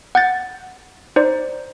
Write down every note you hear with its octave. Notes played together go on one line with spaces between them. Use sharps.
F#5 G6 A6
D#4 C5 D5